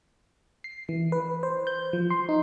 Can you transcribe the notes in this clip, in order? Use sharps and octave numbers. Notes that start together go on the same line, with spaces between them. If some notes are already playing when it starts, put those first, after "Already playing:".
C7
E3
B4
C5
G6
F3
C6
D#4